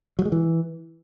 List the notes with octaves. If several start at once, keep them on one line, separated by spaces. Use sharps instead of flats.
F#3
G#3
E3